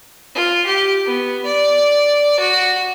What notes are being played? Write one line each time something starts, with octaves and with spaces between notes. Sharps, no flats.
F4
G4
B3
D5
F#4